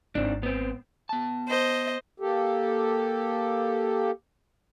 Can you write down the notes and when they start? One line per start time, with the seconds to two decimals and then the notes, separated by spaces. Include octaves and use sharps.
0.15 G#1 D#3 C4 D4
0.43 B3 C4
1.09 B3 A5
1.49 C5 D#5
2.20 A#3 G4 A4